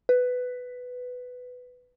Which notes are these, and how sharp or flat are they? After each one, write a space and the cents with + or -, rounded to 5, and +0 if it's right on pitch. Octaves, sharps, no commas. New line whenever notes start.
B4 +10